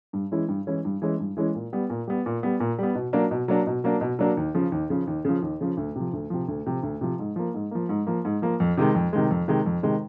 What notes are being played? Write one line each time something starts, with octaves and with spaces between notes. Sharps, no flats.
G2
E3 G#3 C#4 E4
G2
E3 G#3 C#4 E4
G2
E3 G#3 C#4 E4
G2
E3 G#3 C#4 E4
A#2
G3 B3
A#2
G3 B3
A#2
G3 B3
A#2
G3 B3
B2
F#3 A#3 D4
B2
F#3 A#3 D4
B2
F#3 A#3 D4
B2
F#3 A#3 D4
D#2
C#3 F3
D#2
C#3 F3
D#2
C#3 F3
D#2
C#3 F3
D2
C3 F3
D2
C3 F3
D2
C3 F3
D2
C3 F3
G#2
F3 A#3
G#2
F3 A#3
G#2
F3 A#3
G#2
F3 A#3
F2
C3 D#3 G#3
F2
C3 D#3 G#3
F2
C3 D#3 G#3
F2
C3 D#3 G#3